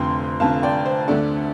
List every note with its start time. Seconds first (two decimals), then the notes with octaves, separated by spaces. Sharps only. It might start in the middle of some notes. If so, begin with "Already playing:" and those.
Already playing: F1 F2 D3 G5 C6
0.40 F1 F2 D3 F5 A5
0.63 D5 G5
0.85 C5
1.08 D2 D3 A3 D4 A4 D5